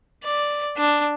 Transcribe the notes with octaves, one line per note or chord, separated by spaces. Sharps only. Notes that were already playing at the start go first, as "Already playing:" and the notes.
D5
D4